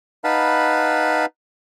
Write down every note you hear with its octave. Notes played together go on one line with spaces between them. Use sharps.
D#4 B4 F5 F#5 A5 B5